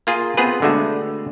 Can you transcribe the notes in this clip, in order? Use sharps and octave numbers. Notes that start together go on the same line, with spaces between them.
A#3 F4 G#4
B3 C4 F4 G#4 B4
D3 G#3 A3 F#4